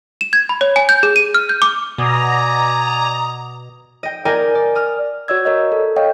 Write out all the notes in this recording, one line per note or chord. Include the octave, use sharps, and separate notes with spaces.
E7
G#6
B5
C#5
G#5
G6
G#4
D#7
F6
G6
D6
B2 D5 G#5 A#5 D#6
D#5 G5
A#4 D5 D#5 G5 G#5
D5
D#6 F6
F#4 C#5 D5 E6 G#6
A#4 C#5 D#5
A4
C#5 D#5 F5 G5